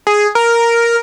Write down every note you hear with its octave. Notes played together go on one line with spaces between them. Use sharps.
G#4
A#4